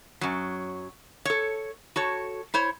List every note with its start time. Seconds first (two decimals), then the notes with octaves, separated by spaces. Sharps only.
0.21 F#2 F#3
1.25 A4 C#5
1.96 F#4 A4 C#5
2.54 E4 C5 C#5